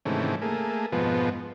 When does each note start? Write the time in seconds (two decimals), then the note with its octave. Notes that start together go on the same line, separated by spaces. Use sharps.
0.05 G#2 C3 D#3 E3 A3 C#4
0.42 A3 A#3 G#4
0.92 F2 G#2 B2 F3 B3